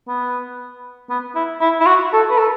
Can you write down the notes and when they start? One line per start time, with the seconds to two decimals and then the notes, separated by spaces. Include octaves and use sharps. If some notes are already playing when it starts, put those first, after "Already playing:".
0.08 B3
1.10 B3
1.36 E4
1.61 E4
1.80 E4
1.86 F#4
2.13 A4
2.30 B4
2.38 A4